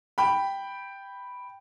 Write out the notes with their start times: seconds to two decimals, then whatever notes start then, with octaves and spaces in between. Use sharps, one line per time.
0.18 G5 B5